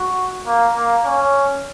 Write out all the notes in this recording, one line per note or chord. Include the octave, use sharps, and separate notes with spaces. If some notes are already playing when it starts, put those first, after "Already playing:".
Already playing: F#4
A#3
A#3
C#4